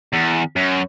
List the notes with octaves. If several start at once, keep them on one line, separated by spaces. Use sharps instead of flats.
E2
F#2